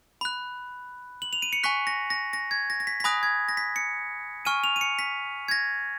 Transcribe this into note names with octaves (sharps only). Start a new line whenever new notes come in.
B5 F#6
F#7
F7
D#7
C#7
G#5 C#6 F#6 B6
A#6
A#6
A#6
G#6
A#6
A#6
B6
B6
G#5 B5 D#6 F#6 A#6
G#6
A#6
B6
C#7
G#5 C#6 F6 D#7
F7
D#7
C#7
B6
G#6
A#6